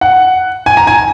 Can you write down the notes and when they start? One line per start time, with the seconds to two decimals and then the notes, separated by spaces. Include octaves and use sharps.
0.01 F#5
0.66 G#5
0.77 A#5
0.87 G#5